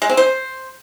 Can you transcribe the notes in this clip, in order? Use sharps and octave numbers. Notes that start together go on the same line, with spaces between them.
G#3
C4
C5